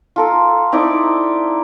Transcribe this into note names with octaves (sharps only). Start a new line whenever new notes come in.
F4 A4 A#4
C4 D#4 E4 D5